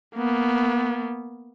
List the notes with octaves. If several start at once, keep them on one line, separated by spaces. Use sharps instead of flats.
A#3 B3